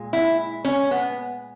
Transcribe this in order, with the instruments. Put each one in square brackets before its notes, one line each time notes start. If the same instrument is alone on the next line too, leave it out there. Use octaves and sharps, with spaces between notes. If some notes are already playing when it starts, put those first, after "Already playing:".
Already playing: [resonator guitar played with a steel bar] A#2 G#3
E4
C#4
B3